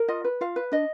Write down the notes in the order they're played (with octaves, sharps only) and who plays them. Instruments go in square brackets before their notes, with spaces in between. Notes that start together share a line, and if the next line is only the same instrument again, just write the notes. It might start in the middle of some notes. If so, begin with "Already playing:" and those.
Already playing: [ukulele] A#4
F4 D#5
B4
F4 F5
B4
D4 D#5